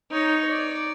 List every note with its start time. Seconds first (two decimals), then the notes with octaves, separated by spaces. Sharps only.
0.11 D#4 C#5
0.50 D5